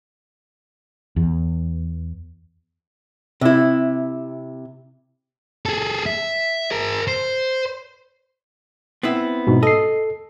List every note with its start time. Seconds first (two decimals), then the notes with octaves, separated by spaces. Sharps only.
1.16 E2
3.41 C3 E4
5.66 G#4 A4
6.06 E5
6.71 G#4 A#4
7.08 C5
9.03 B3 C4 E4
9.47 G#2 B2
9.63 A4 D#5 C7